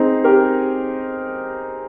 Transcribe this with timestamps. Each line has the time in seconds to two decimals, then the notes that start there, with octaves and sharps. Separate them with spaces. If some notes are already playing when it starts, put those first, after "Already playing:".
Already playing: C4 D#4 G#4 C5
0.24 G4 A#4